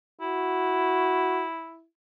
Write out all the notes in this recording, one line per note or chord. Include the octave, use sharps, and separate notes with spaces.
E4 F#4